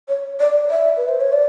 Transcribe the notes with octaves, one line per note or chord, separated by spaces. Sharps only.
C#5
D5
E5
B4
C5
C#5
D5